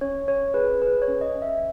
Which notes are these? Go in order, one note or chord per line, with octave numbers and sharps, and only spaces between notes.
C#4 C#5
C#4 C#5
G#4 B4
G#4 B4
C#5
C#4
D#5
C#4
E5